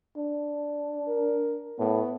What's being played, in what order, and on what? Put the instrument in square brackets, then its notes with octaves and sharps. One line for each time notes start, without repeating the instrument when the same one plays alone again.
[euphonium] D4
[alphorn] A#4
[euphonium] A2 [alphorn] B3